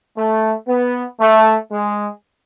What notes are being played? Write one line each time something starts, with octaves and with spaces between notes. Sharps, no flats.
A3
B3
A3
G#3